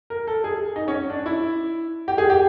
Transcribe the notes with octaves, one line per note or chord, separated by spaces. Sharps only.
A#4
A4
G#4
D#4
C#4
D4
E4
G4
G#4
G4